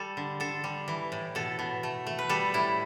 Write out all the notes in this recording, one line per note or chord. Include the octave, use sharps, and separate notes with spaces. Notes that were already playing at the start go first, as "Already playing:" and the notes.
Already playing: G3 A4
D3
D3 A4
G3
E3
A2
B2 A4
B2
A3
A3
B4
G3 A4
A2 E4